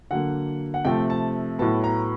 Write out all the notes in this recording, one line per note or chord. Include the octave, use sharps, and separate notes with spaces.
D3 F#3 A#3 F#5
F#5
C3 F3 A3 G5
A5
A2 F#3 B3 A5
A#5